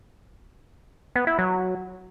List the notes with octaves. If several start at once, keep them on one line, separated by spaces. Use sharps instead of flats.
B3
E4
F#3